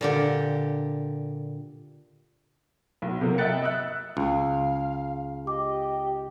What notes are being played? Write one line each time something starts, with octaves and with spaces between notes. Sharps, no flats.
A#2 D3 G4
B1
C3 F3 F#3 A#3
D#5 E5 G5 F#6 A6 C#7
D#5 E5 E6 F#6
C#2 F5
G4 D#5 D6